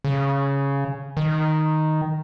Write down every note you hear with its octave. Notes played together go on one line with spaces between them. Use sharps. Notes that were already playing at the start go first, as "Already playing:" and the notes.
C#3
D#3